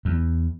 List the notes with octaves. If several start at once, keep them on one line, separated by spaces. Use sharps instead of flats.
E2